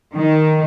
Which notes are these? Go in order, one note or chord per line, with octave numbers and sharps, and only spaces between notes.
D#3